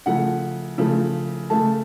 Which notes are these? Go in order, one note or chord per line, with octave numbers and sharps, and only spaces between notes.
C#3 F3 A3 F#5
C#3 F3 A3
C#3 A3 A5